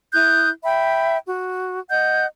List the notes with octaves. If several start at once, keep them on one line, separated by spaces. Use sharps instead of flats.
E4 D#6 F#6 G6
E5 G5 B5
F#4
D#5 F#5 G6